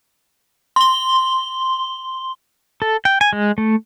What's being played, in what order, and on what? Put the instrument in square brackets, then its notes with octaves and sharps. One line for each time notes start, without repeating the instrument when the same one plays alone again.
[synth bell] C6 G7
[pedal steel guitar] A4
G5
G#5
G#3
A3